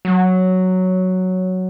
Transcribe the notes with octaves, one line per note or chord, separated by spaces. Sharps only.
F#3